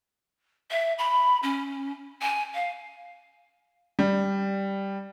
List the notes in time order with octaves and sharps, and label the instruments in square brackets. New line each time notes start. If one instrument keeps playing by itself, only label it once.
[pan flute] E5
B5
C#4
G#5
F5
[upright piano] G3